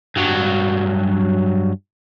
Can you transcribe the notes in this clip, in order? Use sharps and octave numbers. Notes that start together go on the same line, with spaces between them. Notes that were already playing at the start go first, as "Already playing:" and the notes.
G2 F#3